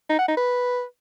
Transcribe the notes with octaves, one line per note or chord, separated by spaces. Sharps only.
D#4
F#5
D#4
B4